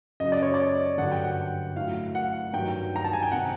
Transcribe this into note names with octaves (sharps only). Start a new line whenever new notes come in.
F#2 C#3 F#3 D#5
D5
C#5
D5
G2 D3 F#3 F#5
G5
F#5
A2 F#3 F5
F#5
G2 D#3 F#3 G5
A#5
A5
G#5
G5
C3 D#3 F#5